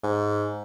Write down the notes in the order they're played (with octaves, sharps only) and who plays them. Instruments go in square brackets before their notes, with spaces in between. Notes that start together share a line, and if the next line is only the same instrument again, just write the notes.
[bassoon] G#2